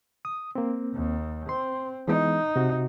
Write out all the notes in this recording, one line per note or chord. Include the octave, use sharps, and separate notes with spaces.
D#6
A#3 C4
D#2
C4 C6
E3 G#3 B3 D#4
C3 F#4